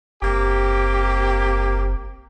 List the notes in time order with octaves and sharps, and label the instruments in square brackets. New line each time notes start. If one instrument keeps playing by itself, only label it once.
[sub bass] F#1 [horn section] A#3 C4 G4